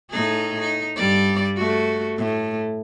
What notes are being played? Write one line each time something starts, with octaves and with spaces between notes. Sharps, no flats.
A2 D#4 G#4
D#4
G2 G3 D5
A3 F#4
A2